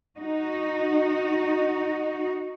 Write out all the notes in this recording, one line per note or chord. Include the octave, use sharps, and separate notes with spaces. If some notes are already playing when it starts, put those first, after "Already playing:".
D#4 F#4